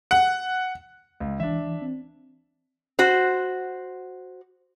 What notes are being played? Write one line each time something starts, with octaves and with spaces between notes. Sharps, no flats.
F#5
C#2
E3 D4 E5
C4
F#4 C5